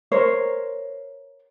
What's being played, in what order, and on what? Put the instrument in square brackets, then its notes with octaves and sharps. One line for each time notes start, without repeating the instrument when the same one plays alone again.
[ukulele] A#4 C5 C#5